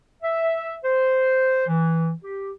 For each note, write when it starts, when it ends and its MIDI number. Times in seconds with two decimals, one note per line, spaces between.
0.23 0.75 76
0.84 1.65 72
1.67 2.11 52
2.24 2.52 67